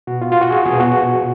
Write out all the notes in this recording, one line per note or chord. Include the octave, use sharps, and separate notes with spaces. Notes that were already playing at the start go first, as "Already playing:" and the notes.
B2 F#4
F4
F4
F#4
G#4
B2 G#4
F#4